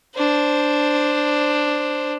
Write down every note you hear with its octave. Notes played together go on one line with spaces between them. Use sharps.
D4 C5